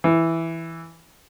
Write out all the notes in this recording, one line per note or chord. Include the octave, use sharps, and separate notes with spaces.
E3